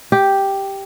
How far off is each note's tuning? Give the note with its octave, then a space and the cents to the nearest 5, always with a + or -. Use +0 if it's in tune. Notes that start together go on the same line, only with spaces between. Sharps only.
G4 +0